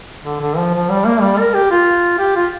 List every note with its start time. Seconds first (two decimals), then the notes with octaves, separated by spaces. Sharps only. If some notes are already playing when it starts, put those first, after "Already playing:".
0.25 D3
0.41 D3
0.57 F3
0.74 F3
0.89 G3
1.05 A#3
1.21 G3
1.39 A#4
1.54 G4
1.71 F4
2.19 G4
2.36 F4